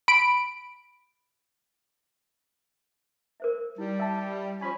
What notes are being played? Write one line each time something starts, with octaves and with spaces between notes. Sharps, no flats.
B5 D7
A#4 C5 E5
G3 E4
E5 A5
F3 C#4 G#5 B5